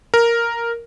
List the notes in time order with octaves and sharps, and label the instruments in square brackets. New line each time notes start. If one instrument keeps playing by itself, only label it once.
[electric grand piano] A#4